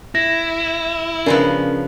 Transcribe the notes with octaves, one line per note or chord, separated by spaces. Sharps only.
E4 A#6
C#3 F3 B3 C#4 D4 A#4